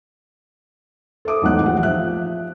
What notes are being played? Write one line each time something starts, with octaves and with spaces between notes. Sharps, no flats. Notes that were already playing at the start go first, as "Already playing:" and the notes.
A4 E5 D6 D#6
E1 B1 A3 D#4 F#5 F#6
A#1 G4 F#5
F3 E5 F#6